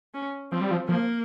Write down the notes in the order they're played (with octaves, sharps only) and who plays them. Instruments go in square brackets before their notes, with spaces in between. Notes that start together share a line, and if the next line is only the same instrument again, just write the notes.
[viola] C#4
[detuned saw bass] F3 [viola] C4
[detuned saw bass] G3
F3
[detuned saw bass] F3 [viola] A#3